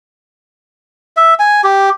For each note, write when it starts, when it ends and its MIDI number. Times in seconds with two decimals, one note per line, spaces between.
1.17 1.34 76
1.39 1.61 80
1.64 1.90 67